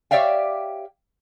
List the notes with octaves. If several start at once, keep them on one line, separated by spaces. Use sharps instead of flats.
G4 C#5 D5 E5 F5 G5